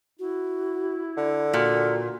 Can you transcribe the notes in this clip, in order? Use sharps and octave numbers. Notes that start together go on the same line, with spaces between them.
E4 F#4
D3
A#2 F#4